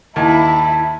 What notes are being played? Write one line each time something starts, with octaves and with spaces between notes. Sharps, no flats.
D#2 E4 A5